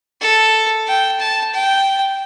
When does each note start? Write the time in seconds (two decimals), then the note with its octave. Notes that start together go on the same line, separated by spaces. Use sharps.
0.21 A4
0.87 G5
1.20 A5
1.54 G5